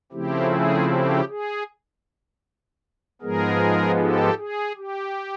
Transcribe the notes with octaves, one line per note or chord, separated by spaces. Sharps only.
C#3 F3 A3 C4 E4 G4
G#4
G4
G#4
G#2 F3 G#3 B3 G#4 A#4
G4 A4
G#4
G4